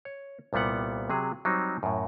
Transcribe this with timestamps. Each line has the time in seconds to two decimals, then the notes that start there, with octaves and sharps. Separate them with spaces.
0.05 C#5
0.53 C2 A#2 G3 B3 F#5
1.10 C3 F#3 G#4
1.45 F#3 G3 C4 D#4
1.83 F#2 A2